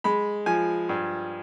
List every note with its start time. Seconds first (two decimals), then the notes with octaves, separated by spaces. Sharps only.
0.04 G#3 B5
0.46 F3 G#5
0.89 G2